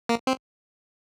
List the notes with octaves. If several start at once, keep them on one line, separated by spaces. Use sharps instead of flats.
A#3
C4